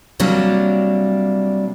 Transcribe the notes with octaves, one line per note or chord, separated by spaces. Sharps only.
C3 F#3 G3 A#3 D4